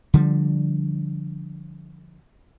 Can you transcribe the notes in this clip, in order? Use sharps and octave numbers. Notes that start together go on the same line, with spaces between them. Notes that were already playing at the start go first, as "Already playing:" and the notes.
D3 F3 G3